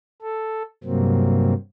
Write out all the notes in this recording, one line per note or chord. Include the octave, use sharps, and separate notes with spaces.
A4
G2 C3 F#3 A#3 C4